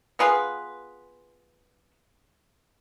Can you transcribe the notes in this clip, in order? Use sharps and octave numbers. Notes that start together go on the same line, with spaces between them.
B3 F4 G#4 B4